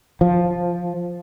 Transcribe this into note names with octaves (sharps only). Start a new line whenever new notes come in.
F3